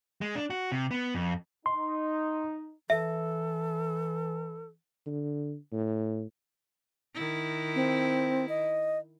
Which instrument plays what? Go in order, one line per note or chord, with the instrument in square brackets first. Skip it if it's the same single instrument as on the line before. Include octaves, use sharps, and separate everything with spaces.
[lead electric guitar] G#3
D4
F#4
C3
B3
F2
[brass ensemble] D#4 [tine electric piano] C6
[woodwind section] E3 [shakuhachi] A4 [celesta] E5
[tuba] D3
A2
[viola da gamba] D#3 E4
[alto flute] C4
D#5